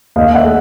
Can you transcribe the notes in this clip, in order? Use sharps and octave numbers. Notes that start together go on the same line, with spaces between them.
D#2 D#5 F5
E5 F#5
A3